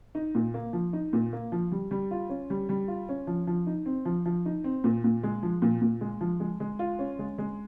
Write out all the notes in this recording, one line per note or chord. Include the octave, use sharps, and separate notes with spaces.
D#4
A#2
A#3
F3
D#4
A#2
A#3
F3
G3
G3
F4
C#4
G3
G3
F4
C#4
F3
F3
D#4
C4
F3
F3
D#4
C4
A#2
A#2
G#3
F3
A#2
A#2
G#3
F3
G#3
G#3
F4
C#4
G#3
G#3